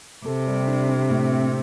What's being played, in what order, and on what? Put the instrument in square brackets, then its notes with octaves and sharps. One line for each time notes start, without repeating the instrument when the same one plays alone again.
[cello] C3 [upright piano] A4
[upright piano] G3
D4
D4
A2
C4